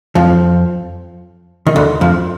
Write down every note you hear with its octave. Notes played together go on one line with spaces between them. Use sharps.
F2 F3
D#3
D2 D3
F2 F3